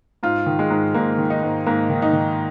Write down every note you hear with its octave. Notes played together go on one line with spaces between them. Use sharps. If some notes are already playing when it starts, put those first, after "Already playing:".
G#2 F4
D#3
G#3
G#2
G#2 A#3
D#3
D#4
G#2
G#2 A#3
D#3
D#4
D#3